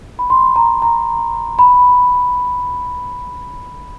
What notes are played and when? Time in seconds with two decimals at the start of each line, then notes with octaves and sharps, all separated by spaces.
0.19 B5
0.30 C6
0.56 A#5
0.82 A#5
1.59 B5